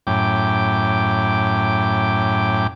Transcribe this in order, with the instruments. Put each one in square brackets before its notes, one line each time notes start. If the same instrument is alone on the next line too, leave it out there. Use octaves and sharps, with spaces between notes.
[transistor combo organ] F#2 A2 G5 D6